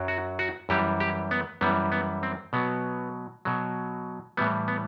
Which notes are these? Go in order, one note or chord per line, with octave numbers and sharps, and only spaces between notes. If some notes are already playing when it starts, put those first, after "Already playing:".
Already playing: F#2 F#3
F#4
F#4
F#2 E3 G3 G4
G4
B3
F#2 E3 G3 B3
B3
C4
B2 F#3 B3
B2 F#3
A2 E3 G3 B3
B3